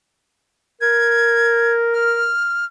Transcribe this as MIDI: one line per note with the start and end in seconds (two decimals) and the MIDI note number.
0.81 2.31 70
0.81 1.74 92
1.94 2.65 89